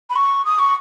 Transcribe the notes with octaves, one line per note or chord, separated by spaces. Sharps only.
B5
C#6
D#6
C#6